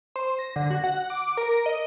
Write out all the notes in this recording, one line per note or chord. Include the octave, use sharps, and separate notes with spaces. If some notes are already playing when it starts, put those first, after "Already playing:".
C5
A#6
D3
F#4
F#5
D6
A#4
D#5